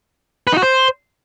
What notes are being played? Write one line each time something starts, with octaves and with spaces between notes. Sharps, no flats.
B4
D#4
F#4
C5